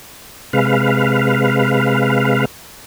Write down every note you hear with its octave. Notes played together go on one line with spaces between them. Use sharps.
C3 G#3 B4 F5